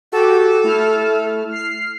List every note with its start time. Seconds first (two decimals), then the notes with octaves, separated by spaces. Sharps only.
0.12 F#4 G4 A4
0.64 A3 E4 F6
1.49 F6 C7